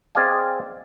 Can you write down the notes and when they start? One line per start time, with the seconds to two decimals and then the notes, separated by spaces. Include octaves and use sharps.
0.15 C4 G#4 D5 D#5 F5 G#5